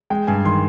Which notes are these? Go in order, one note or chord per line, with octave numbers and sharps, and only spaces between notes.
G#3 G5
G2 G#5
D#3 C6